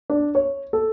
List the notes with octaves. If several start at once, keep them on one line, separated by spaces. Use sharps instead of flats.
D4
C#5
A4